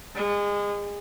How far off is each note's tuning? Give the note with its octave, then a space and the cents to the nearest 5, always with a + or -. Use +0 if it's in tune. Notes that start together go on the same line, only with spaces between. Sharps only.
G#3 -30